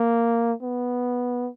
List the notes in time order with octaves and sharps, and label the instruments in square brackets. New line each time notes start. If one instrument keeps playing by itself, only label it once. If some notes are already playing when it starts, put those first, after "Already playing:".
Already playing: [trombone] A#3
B3